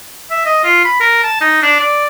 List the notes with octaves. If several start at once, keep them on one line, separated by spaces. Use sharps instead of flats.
E5
D#5
F4
B5
A#4
A5
D#4
D4
D5